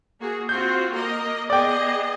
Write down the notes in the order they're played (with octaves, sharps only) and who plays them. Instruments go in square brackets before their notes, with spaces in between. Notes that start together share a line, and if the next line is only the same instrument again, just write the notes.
[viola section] A#3 F#4 G#4
[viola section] C4 F4 F#4 [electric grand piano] G6
[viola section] A#3 A#4 D#5
[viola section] B3 G#4 D#5 [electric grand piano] D5 G5